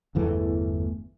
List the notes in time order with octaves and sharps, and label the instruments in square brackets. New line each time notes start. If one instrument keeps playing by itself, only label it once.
[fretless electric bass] G1 E2 E3 A3